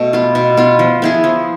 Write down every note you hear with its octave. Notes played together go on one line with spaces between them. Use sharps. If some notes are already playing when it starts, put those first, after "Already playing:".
Already playing: B2 A3
B3 F4
B2
B3 F4
F3
B3 E4 G#4
F3